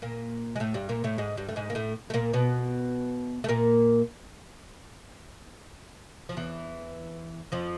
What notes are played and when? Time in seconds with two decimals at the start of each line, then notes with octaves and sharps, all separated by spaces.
0.02 A#2 A#3
0.56 G#3
0.60 A2 A3
0.74 G2 G3
0.89 A#2 A#3
1.04 A2 A3
1.18 G#2 G#3
1.37 G2 G3
1.49 A3
1.56 G#2 G#3
1.70 A#3
1.75 A2 A3
2.10 A3
2.14 A#2 A#3
2.33 B2 B3
3.44 A3
3.48 A#2 A#3
6.29 F3
6.37 E2 E3
7.52 F2 F3